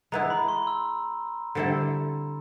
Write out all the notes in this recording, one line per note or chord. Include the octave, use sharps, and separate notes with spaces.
G#3 B3 E4 A#5
B5
C6
E6
D3 G3 C4 E4 A4